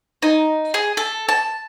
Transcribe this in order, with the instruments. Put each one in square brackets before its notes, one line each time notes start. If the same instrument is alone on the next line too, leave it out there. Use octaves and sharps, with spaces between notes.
[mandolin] D#4
G#4
A4
A5